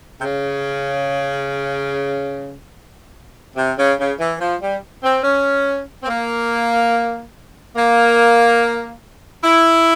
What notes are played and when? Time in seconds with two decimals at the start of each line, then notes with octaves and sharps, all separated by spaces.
0.18 C3
0.21 C#3
3.56 C3
3.78 C#3
3.99 C#3
4.19 E3
4.40 F3
4.62 G3
5.04 C4
5.23 C#4
6.02 C4
6.08 A#3
7.76 A#3
9.43 E4